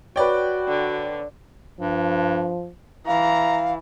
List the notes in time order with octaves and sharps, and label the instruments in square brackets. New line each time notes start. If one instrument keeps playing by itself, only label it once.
[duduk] F#4 [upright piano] B4 C#5 [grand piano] D5 G5
[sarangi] D3
[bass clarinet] G2 [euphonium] F3
[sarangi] E3 [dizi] F5 [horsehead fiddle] A#5